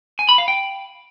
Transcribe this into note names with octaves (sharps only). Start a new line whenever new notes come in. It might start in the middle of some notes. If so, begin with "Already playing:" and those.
G#5
B5
F5
G5